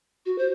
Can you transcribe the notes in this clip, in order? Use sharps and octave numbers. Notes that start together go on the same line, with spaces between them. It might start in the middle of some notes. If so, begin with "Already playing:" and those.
F#4
C5